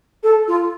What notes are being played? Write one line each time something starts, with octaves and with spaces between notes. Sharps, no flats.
A4
F4